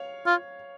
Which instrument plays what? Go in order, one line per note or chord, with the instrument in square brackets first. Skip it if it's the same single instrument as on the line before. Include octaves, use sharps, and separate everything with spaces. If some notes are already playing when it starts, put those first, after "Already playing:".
Already playing: [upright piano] C#5 F5
[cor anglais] F4